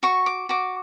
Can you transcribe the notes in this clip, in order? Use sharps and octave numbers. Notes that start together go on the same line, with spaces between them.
F#4 C#6
D6
F#4 D6